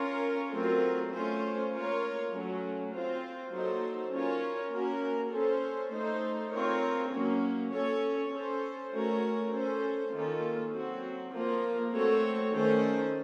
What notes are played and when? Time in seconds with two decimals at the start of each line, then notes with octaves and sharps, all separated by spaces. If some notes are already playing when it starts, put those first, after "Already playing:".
Already playing: C#4 F4 A#4 C#5
0.52 F#3 A3 C4 F4 A#4
1.11 A3 C#4 F4 C5
1.72 A#3 F4 A#4 C#5
2.32 F#3 A3 C#4
2.92 C4 F4 C5
3.52 F#3 A#3 D#4 A4 C5
4.11 C#4 F4 A#4 C#5
4.71 A#3 C#4 F#4 A#4
5.31 C#4 A4 C5
5.92 A3 D#4 A4 C5
6.53 C4 F4 A#4 C#5
7.12 F#3 A#3 C#4
7.72 C#4 A4 C#5
8.31 C#4 A4 C5
8.92 A3 C#4 F#4 A#4 C#5
9.52 C#4 A4 C5
10.12 D#3 A#3 C#4 F4 A4
10.72 F#3 C4 F#4
11.32 F3 A#3 F4 A#4
11.92 A3 C4 F#4 A4 C#5
12.52 D#3 A3 C#4 A4 C5